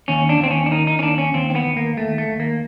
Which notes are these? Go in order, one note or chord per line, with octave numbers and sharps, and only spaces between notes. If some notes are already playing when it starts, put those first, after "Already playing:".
D#2 C#4
D4
D#2 C4
C#4
D4
D#3 D#4
D#4
C#4
D#2 D4
C#4
D#2 C4
C4
B3
D#2
A#3
D#2 A3
A3
D#2
A#3